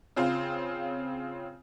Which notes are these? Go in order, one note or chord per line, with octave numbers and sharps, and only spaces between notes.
C#3 C4 F4